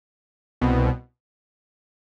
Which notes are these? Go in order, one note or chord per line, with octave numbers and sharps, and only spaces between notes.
C2 B2